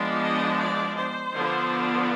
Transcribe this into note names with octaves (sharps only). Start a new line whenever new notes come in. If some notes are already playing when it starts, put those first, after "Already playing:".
Already playing: F3 G#3 B3 D4
D#5
D5
C5
D3 F3 B3 D4